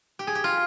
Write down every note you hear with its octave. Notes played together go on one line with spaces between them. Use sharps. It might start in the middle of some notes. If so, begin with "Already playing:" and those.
G4
G#4
G4
F4